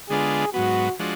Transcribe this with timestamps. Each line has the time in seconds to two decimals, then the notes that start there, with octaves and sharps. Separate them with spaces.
0.09 D3 G#3 B3 D4 F4 G#4
0.53 G#2 F#3 B3 F#4
0.99 F3 G#3 D4 F#4